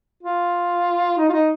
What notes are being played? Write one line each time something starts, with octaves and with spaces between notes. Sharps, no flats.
F4
D#4
F4
D#4